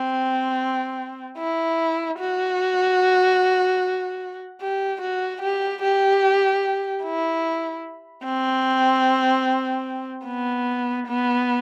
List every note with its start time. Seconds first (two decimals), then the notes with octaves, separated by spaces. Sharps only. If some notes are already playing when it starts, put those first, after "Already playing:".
Already playing: C4
1.38 E4
2.19 F#4
4.61 G4
5.01 F#4
5.42 G4
5.82 G4
7.04 E4
8.25 C4
10.26 B3
11.07 B3